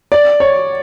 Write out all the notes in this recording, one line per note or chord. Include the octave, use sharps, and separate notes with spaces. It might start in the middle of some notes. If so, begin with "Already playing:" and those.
D5
C#5